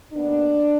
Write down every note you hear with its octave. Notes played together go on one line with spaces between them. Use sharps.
D#2 D#3 B3 D4